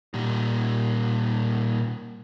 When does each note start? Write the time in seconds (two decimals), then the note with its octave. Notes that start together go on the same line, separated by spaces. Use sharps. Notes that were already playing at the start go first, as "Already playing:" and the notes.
0.14 A#2 G3